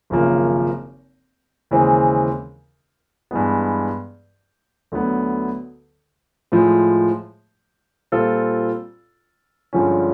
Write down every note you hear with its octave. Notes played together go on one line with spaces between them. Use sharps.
G#1 F#2 C#3 F3 A#3
D#2 C#3 E3 G#3 C4
G2 E3 G#3 B3
D2 D3 F#3 B3
A2 F3 G#3
A#2 G3 C4 F4 A4
G2 D3 F3 G#3 C#4